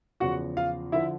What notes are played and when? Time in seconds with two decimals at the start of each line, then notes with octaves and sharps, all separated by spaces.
0.20 E2 C#3 F3 F#4 F#5
0.57 F4 F5
0.92 D3 F3 E4 E5